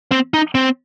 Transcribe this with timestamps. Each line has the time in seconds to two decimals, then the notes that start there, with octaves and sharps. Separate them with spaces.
0.12 C4
0.34 D#4
0.55 C4